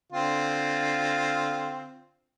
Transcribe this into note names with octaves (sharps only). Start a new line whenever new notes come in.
D3 C4 F4